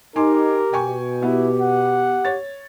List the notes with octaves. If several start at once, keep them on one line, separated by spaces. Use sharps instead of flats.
D#4 G4 A#4 G#5 C6 D6
B2 G5 G#5 C#6
B3 E4 G4
F#5
C#5 A6